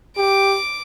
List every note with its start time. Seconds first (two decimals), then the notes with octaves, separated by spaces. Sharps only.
0.17 G4 D6 D7